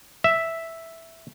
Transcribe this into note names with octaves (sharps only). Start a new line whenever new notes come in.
E5